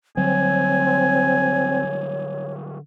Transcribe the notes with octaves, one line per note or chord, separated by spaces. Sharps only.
D3 F#3 G3 C4 C#5 G#5